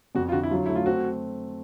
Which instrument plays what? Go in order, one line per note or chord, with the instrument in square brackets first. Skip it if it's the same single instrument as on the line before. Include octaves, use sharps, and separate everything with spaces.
[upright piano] F2 [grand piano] F#4
[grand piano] F4
[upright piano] D3 [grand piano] F#4
[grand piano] E4
[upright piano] F#3 [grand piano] F4
[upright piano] A3 [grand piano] E4
[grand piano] F4
[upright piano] C4 [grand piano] F#4